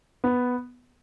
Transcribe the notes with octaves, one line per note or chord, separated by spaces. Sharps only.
B3